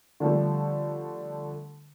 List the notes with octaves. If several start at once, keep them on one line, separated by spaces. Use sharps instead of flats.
D3 F3 G3 A3